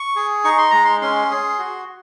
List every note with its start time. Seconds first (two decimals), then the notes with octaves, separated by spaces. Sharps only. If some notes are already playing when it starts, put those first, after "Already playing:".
Already playing: C#6
0.16 G#4
0.45 D#4 C#6
0.58 C6
0.71 G#3 A#5
0.85 C6
1.02 C#4 C6
1.31 G#4
1.59 F#4